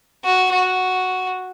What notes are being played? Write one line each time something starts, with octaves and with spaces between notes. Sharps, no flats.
F#4
F#4